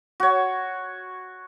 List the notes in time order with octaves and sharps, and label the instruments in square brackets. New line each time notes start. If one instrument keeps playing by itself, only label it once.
[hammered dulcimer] F#4 C#5